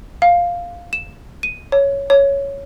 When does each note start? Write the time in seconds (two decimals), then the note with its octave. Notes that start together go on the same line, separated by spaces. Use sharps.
0.22 F5
0.93 E7
1.43 D#7
1.72 C#5
2.10 C#5